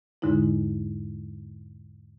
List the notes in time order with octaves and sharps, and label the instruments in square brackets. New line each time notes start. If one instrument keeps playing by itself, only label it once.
[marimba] E2 G#2 D3 G#3 D#4 E4